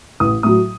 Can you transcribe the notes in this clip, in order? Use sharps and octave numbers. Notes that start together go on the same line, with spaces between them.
A1 D#6
A2 F#3 D#6